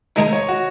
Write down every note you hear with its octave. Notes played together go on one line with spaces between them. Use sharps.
D#3 G#3 D#4 G#4 D#5
C#5
F#4